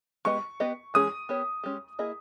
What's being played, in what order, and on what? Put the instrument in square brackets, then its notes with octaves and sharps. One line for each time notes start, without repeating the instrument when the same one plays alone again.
[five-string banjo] G#3 B3 G4 B4 D#5 [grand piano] C#6
[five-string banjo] B3 G4 B4 D#5
[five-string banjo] E3 G#3 C#4 G#4 [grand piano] D#6
[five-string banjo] B3 G4 A#4 C#5
G#3 C#4 G4
A#3 E4 G#4 D#5